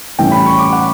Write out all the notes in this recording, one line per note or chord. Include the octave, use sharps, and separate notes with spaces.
A2 E3 G3 C#4 G5
B5
C#6
D6
F#5